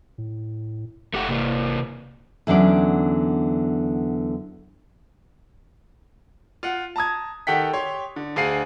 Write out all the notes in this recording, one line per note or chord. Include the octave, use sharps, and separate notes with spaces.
A2
F#1 A3 G4 F#5
C3 A#3
E2 D3 F#3 C#4 D5
F4 F#5
A5 A#5 D#6 G#6
D#3 G4 A4 F#5 G5 B6
G4 C#5 C6
D3
D2 G#4 F5 C7 D#7